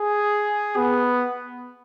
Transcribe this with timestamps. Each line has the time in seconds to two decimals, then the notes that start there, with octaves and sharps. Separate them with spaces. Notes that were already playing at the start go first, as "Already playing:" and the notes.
Already playing: G#4
0.76 B3